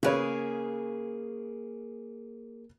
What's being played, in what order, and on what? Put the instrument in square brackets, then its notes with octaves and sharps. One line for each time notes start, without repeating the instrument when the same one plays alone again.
[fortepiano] C#3 B4 C#5 [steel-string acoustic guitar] A#3 G#4